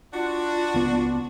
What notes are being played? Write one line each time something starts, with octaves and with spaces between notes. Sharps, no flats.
D4 F4 F#4
C#2 B3